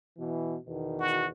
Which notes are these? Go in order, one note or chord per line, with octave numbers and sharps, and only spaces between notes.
B2 E3
E2 B2 D#3
F#4